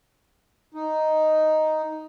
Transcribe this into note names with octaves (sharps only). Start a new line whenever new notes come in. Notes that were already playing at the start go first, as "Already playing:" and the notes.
D#4